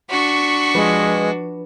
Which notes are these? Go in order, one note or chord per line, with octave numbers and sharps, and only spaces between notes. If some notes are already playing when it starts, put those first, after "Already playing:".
D4 F#4 B5 C#6
F3 G#3 B4